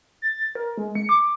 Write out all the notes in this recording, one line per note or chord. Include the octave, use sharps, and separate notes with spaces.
A6
A#4
G#3
C#7
D6